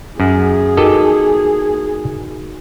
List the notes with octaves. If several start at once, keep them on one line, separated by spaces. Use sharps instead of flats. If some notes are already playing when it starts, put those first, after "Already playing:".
F#2 G#4
D#4 F#4 G4 A4 A#4 D#5